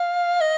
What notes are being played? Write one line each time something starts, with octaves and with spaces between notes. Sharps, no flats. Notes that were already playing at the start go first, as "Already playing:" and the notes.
Already playing: F5
D#5